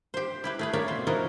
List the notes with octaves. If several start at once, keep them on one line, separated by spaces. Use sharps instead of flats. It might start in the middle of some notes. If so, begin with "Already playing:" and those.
G4 C5
E4 G4 B4
A3 G#4 B4
A#3 A#4 C#5 D5 E5
B2 C4 C5
F3 E4 F#4 A#4 D5 D#5